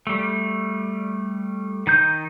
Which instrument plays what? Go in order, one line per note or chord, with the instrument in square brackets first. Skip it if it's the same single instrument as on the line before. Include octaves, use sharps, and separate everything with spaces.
[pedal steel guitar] G3 A3
D#3 D#4 G6